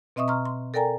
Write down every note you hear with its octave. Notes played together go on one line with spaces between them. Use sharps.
B2 C4 D#5 E5 C#6 D#6
A#5 C6 C#6 F6
C6
A4 A#4 D5 G5 G#5 A#5